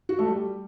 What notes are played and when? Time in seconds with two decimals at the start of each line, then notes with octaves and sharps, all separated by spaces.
0.09 F#4
0.19 A3
0.28 G3